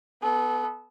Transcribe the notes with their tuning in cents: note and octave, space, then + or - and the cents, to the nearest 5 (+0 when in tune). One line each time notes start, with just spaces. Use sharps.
B3 +0 A4 -30